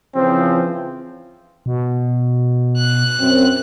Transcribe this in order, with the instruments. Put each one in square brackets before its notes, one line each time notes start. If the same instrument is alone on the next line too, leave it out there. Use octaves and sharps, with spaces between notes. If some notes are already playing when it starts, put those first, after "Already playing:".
[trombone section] C#3 E3 F3 [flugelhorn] C4
[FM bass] B2
[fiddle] F#6
[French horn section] F#2 C4